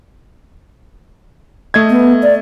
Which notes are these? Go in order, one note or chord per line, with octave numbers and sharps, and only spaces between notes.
A3 D#5 G#6
B3
D5